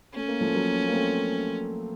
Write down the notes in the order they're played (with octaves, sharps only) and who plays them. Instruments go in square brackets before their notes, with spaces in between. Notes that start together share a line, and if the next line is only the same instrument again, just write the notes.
[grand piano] A3 [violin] C#4
[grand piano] A#3
F3 A3
F#3 A#3
A#3
A3 C4